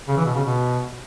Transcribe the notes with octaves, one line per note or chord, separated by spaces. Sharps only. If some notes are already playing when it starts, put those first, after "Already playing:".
C#3
E3
B2
C#3
B2